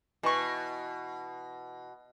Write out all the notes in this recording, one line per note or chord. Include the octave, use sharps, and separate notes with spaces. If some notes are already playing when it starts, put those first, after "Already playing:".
B2 E3 C#6